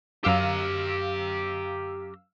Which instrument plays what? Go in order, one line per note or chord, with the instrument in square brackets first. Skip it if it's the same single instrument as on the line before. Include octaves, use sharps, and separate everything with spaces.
[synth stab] F#2 F5 E6 [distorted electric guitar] G4 A#5